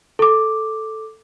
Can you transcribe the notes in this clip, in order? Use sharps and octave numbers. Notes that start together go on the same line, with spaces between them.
A4 D6